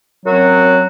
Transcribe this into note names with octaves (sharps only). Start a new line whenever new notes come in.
F#2 F#3 C4 F#4